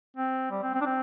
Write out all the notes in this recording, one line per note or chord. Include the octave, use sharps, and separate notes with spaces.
C4
G3
C4
C4
D4
C4